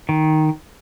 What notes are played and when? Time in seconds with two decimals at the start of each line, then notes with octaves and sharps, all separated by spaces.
0.09 D#3